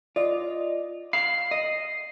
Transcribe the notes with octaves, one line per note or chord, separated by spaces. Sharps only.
F4 D5 D#5
F5 B5 C7
D#5